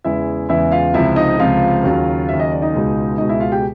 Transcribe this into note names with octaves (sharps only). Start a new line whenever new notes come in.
E2 C#3 E3 G#3 E4 E5
E2 C#3 E3 G#3 E4 E5
F4 F5
C#2 C3 F3 E4 E5
D#4 D#5
C#2 C3 F3 F4 F5
D#2 C#3 F#3
D#2 C#3 F#3 E5
D#5
D5
D#4 D#5
C#2 B2 G#3
C#2 B2 G#3 D#4 D#5
E4 E5
F4 F5
G4 G5